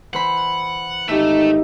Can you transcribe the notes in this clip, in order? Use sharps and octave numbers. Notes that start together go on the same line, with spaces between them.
E3 C5 F#5 B5
G#1 A3 D#4 G4 E5